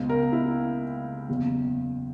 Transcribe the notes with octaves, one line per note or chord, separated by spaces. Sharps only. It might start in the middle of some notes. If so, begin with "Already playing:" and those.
Already playing: C#2 B2
A#4
E4
F#1 E2 B2